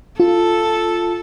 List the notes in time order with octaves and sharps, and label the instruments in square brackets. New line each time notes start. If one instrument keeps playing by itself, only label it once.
[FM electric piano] F4 [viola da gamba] A4